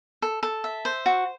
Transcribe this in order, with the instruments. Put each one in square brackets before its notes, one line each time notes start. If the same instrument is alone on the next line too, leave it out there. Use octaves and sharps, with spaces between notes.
[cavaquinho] A4
A4
E5
C5
F#4